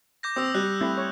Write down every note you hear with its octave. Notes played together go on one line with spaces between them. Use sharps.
D6 G6 A#6
C4 D#6 E6 F7
G3 F#6
A3 C4 E4
C#5